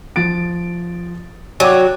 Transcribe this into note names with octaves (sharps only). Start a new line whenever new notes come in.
F3 A6 D7
F#3 D5 G5 D6